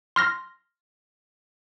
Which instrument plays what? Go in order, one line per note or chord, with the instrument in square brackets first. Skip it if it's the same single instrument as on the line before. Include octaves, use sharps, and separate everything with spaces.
[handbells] C6 F6 A#6